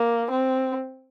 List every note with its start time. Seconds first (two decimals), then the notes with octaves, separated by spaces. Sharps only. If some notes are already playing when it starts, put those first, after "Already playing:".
Already playing: A#3
0.31 C4